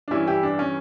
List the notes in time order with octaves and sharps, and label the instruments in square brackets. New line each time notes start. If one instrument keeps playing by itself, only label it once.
[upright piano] D4
G2 E3 C#4 E4
E4 G4
D4
C#4